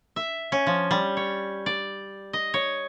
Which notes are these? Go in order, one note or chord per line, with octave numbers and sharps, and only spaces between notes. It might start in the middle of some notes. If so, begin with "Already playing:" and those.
E5
C#4
F3
G3
C#5
D5
D#5
C#5